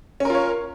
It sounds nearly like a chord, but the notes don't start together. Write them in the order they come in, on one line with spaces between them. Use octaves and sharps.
C#4 A#4 F4 C#5